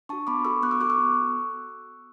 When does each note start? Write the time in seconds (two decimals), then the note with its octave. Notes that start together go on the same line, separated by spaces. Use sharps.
0.09 D4 F#4 A5 C#6
0.27 B3 B5 D6
0.45 F#4 A4 C#6 E6
0.63 B3 D6 F#6
0.71 C#6 E6
0.80 F#4 A4 D6 F#6
0.90 C#6 E6
0.98 B3